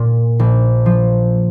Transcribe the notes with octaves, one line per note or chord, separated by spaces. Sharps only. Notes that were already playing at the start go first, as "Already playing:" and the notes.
Already playing: A#2
A#1
F3